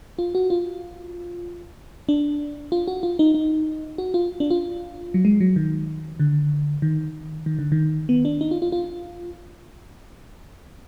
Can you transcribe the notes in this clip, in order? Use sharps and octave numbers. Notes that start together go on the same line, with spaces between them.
F4
F#4
F4
D4
F4
F#4
F4
D#4
D#4
F#4
F4
D4
F4
F#3
G#3
F#3
D#3
D3
D#3
D#3
D3
D#3
B3
D4
D#4
F4
F4
F4